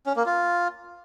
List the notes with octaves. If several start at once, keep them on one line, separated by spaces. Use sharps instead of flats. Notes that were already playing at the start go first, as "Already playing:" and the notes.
C#4
A#3
F4